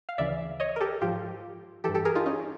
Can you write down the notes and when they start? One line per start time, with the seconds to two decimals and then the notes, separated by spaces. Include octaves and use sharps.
0.09 F5
0.18 D2 C#3 E3 D5 E5
0.60 C#5 D#5
0.76 A#4
0.80 G4 A4
1.01 G#2 F3 F4 G4
1.84 E3 G4 A4
1.88 G2
1.95 G4 A4
2.05 G#4 A#4
2.15 D#4 F4
2.26 C#4 D#4